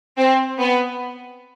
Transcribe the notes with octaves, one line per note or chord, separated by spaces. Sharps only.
C4
B3